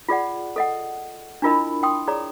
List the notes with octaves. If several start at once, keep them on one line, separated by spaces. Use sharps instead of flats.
F4 G#4 D5 F#5
A4 D#5 F#5
D4 E4 F4 A#4 D#5 B5
G5 C6 D#6
G#4 C#5 D5 A#5